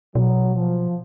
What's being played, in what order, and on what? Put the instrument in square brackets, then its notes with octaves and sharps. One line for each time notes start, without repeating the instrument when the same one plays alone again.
[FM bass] B2 [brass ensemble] F#3
[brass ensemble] F3